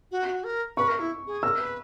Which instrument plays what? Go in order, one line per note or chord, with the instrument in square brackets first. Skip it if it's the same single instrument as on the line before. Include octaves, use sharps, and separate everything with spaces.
[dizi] F#4
F#4
A#4
[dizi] B4 [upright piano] C#6
[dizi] A#4
E4
G#4
[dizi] A#4 [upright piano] E6
[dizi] B4